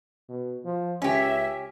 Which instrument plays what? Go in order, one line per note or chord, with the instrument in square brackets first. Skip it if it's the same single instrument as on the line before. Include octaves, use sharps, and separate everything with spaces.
[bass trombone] B2
F3
[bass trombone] C#2 [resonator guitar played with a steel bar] C#4 G4 [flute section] E5